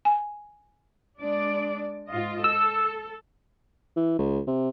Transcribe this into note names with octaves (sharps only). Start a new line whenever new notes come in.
G#5
G#3 D4 D5
G#2 F4 D#5
A4 E6
E3
C#2
C3